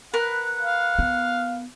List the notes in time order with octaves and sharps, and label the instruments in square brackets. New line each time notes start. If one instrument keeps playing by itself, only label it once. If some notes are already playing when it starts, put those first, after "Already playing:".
[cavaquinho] A#4 B4 B5 [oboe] F#5
[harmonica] F5
[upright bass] B3